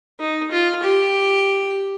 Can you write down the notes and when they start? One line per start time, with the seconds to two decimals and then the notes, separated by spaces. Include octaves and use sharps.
0.20 D#4
0.51 F4
0.83 G4